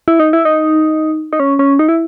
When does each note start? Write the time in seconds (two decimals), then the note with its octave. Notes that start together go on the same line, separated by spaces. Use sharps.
0.08 E4
0.20 D#4
0.33 E4
0.45 D#4
1.33 D#4
1.40 C#4
1.59 C#4
1.79 D#4
1.89 E4